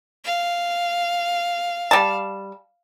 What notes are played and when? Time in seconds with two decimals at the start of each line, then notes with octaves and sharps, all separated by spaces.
0.24 F5
1.91 G3 A5